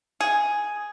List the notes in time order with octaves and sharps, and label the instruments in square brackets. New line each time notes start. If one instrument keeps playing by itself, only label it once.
[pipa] G#4